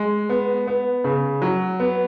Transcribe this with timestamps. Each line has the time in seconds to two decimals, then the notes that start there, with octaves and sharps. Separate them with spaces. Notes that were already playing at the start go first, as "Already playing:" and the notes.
Already playing: G#3
0.29 B3
0.67 B3
1.04 C#3
1.42 F#3
1.80 B3